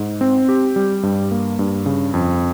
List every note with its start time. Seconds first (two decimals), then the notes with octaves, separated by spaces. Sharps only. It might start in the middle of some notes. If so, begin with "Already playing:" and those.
Already playing: G#2
0.21 C4
0.49 G4
0.76 G3
1.03 G2
1.31 A#3
1.59 G2
1.86 C#3
2.14 F2